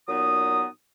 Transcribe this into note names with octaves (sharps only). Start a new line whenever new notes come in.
A#2 F#3 B3 D#4 D#6